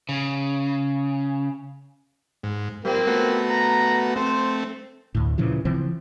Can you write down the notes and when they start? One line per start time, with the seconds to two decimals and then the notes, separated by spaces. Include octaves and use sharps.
0.09 C#3
2.43 G#2
2.85 G3 A#3 C4 F4
3.07 A3 B3 F#4
3.49 A#5
4.16 A3 C4 C5
5.15 D2 A2
5.38 A#2 C#3 E3 F3
5.65 C#3 E3 F3 C4